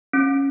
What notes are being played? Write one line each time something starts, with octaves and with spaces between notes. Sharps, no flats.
C#4